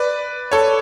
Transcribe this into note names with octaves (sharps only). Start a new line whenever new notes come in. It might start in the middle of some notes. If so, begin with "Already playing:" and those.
Already playing: B4 D5
A4 C#5